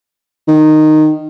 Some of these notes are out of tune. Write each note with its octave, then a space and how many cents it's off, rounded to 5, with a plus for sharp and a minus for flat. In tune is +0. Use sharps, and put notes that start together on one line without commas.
D#3 -10